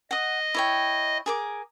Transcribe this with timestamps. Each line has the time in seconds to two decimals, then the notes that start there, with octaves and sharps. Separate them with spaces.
0.11 D#5 F#5 D#6
0.54 E4 C#5 G5
1.26 G#4 A#4 D6